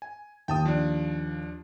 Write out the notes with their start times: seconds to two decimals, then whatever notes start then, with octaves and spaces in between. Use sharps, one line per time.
0.02 G#5
0.48 D#2 G5 A5 D#6
0.65 F3 D4